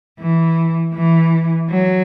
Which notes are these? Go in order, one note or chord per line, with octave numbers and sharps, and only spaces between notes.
E3
E3
F#3